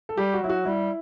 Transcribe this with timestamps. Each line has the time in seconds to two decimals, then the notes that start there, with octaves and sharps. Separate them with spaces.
0.09 A4
0.17 G3 G4
0.34 F#4
0.42 F#3 E4
0.49 F#4
0.65 G3 E4